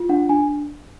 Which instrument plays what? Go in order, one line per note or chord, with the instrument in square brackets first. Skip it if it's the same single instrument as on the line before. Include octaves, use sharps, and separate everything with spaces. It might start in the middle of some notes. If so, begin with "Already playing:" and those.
Already playing: [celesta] F4
D4 F#5
D4 G#5